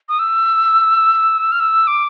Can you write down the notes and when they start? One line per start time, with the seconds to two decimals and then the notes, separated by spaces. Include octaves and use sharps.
0.09 D#6
0.19 E6
1.52 F6
1.60 E6
1.87 D6